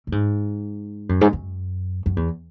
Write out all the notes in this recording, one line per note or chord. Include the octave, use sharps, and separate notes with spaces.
A2
G#2
F#2
G#2
F#2
F#2
E2